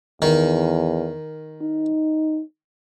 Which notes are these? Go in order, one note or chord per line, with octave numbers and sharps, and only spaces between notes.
E2 D#3
D#4